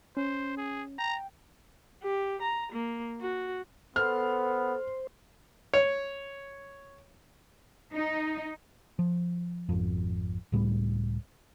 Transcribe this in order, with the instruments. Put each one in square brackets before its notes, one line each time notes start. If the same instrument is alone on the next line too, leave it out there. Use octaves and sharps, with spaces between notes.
[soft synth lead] C#4 [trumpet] C5
[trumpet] G#4
[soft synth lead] G5 [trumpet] A#5
[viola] G4
A#5
A#3
F#4
[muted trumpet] B3 [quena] A4 [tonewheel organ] C5 [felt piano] F6
[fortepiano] C#5
[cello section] D#4
[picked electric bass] F3
G#1 F2
C#2 A2 G3 B3